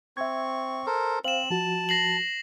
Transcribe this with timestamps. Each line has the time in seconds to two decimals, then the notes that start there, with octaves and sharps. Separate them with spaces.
0.17 C4 E5 C#6 G#6
0.86 A4 A#4 C5
1.24 C4 C5 F5 E7 F#7
1.50 F3 F#4 A5
1.89 A#6 C7 F#7